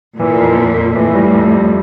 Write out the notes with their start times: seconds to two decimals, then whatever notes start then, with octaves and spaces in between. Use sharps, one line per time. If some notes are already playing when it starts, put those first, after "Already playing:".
0.19 A#2 E3
0.38 F2
0.57 F2
0.76 F2
0.96 A2 E3
1.15 G3
1.34 F2
1.53 G3